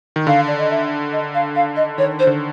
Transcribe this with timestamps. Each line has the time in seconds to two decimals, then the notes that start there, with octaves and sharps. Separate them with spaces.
0.16 D#3
0.27 D3 F5
0.47 D5
0.59 D#5
0.70 E5
1.12 D#5
1.34 F5
1.56 F5
1.76 D#5
1.98 D#3 C#5
2.19 C5
2.27 D3